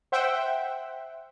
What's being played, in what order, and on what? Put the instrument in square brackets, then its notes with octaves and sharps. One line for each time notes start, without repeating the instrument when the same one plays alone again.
[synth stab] C5 E5 F#5 G5